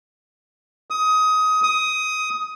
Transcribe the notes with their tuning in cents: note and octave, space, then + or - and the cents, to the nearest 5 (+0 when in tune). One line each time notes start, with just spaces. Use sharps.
D#6 +20
D#6 +15